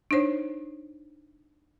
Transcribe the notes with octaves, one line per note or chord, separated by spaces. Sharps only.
D4 D#4 C5 C#5